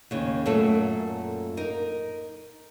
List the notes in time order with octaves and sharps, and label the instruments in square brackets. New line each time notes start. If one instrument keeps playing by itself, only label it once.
[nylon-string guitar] D#2 C#3
F#2 A#2 A3 A4
D#4 A#4